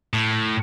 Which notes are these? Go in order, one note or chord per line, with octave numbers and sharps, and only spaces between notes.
A2